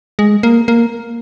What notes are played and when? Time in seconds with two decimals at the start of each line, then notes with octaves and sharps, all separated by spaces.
0.19 G#3
0.43 A#3
0.68 A#3